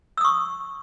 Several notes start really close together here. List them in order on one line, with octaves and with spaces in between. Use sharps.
E6 D#6 C#6